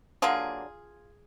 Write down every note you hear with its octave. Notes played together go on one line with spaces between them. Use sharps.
D3 F#3 A#3 F4 G#4